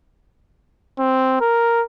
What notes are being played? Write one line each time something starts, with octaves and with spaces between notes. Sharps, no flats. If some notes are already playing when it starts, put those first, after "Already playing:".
C4
A#4